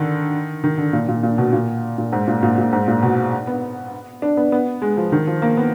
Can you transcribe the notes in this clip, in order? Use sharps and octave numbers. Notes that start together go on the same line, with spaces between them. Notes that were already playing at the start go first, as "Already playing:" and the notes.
Already playing: D3 D#3
D#3
D3
A#2
A#2
A#2
B2
A#2
A#2
G#2
A#2
A#2
A#2
G#2
A#2
B2
B3
D4
B3
B3
G#3
F3
D#3
F3
A#3
B3